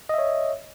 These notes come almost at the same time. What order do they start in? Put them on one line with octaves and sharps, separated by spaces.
D#5 E5 C#5